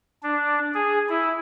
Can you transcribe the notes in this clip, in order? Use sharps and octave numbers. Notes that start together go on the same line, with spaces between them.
D4
G#4
E4